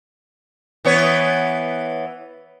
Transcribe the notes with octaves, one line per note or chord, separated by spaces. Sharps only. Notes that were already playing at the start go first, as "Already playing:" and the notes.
E3 B3 C#5